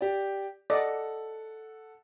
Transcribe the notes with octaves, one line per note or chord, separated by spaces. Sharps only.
G4 D5
A4 D5 D#5 F#5